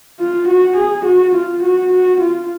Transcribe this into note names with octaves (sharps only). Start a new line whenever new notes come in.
F4
F#4
G#4
F#4
F4
F#4
F#4
F4